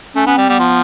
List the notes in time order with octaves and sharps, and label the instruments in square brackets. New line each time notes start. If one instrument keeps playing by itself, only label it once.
[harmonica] A3 [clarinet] C#4
[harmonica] B3 [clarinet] C#4
[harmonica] G3 [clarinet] C4
[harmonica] G3 [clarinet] B3
[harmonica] F3